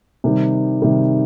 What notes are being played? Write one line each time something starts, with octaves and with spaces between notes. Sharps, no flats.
C3 D#3 G3
C3 D#3 G3